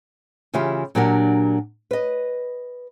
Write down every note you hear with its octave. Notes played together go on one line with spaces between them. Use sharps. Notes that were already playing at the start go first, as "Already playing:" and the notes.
C#3 E3 E4 F4 G4
A#2 F#3 D4 G4 A#4 F#5
B4 D#5